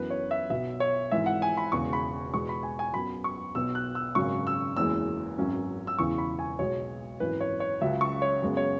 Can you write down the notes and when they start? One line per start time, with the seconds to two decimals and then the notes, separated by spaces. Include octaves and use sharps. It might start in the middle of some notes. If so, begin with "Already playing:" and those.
Already playing: F#2 E3 B3 B4
0.10 C#5
0.31 E5
0.50 B1 B2 B3 E5
0.80 C#5
1.12 G#1 G#2 E3 E5
1.26 F#5
1.42 G#5
1.57 B5
1.72 E1 E2 C#3 G#3 C#6
1.93 B5
2.33 E2 B2 G#3 B3 C#6
2.49 B5
2.63 G#5
2.79 G#5
2.94 F#2 F#3 B3 B5
3.24 C#6
3.55 B1 B2 B3 E6
3.75 F#6
3.95 E6
4.15 G#1 F#2 C#3 F#3 C#4 C#6
4.47 E6
4.76 F#1 E2 E3 G#3 E6
5.38 G#1 F#2 F#3 C#4
5.87 E6
5.98 E1 E2 C#3 E3 C#6
6.18 B5
6.39 G#5
6.59 B1 B2 G#3 C#5
7.20 G#1 F#2 E3 B4
7.41 C#5
7.60 C#5
7.81 C#2 C#3 F#3 E5
8.01 C#6
8.22 C#5
8.42 F#2 C#3 G#3 B3
8.57 C#5